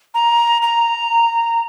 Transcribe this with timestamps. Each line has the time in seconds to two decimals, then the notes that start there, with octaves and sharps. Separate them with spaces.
0.14 A#5
0.62 A#5